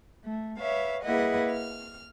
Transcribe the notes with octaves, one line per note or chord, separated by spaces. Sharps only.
A3
B4 C#5 E5 F5
A#3 E4 G#4 B4 D#5 F#5
F6